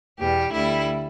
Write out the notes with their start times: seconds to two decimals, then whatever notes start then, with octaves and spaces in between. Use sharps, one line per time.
0.18 E2 B2 G3 G4
0.52 D2 D3 G3 E4